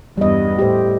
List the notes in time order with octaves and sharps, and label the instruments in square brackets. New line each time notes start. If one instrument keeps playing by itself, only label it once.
[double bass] E2 G2 [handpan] G3 D#5
[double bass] A2 [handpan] G4 C5